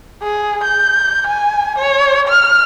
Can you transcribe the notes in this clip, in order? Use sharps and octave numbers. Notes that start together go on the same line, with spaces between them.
G#4
G6
G#5
C#5
F6